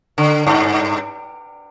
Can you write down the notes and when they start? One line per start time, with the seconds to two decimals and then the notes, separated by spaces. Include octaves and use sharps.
0.18 D3
0.47 G2